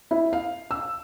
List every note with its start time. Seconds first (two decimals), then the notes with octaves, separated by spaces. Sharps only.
0.11 E4
0.33 F5
0.71 E6